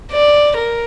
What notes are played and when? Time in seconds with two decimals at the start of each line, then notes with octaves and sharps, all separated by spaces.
0.12 D5
0.57 A#4